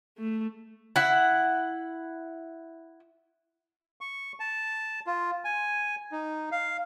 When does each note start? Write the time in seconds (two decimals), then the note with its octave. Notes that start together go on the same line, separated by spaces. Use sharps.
0.18 A3
0.96 E4 F#5
4.01 C#6
4.40 A5
5.07 F4
5.44 G#5
6.12 D#4
6.52 F5